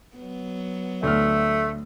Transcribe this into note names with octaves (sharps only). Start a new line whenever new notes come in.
F#3 B3
D2 A3 E5 F6